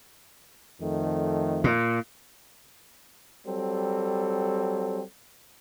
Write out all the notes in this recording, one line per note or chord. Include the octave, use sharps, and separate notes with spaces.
F2 D#3 A3
A#2
F#3 G3 C4 A4